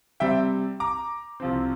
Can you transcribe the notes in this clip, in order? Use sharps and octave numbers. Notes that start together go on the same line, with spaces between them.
C3 G3 C4 E5 G5
A#5 D6
C2 C3 F3 C4